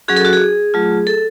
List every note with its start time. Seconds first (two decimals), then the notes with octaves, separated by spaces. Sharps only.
0.08 F#3 C#4 F#4 G#4
0.16 A4
0.25 F#4
0.33 G#4
0.74 F#3 A3 F4
1.07 A4